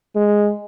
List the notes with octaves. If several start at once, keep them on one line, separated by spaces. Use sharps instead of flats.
G#3